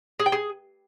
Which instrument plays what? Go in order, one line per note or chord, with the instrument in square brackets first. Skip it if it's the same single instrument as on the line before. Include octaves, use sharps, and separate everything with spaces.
[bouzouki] G#4
G5
G#4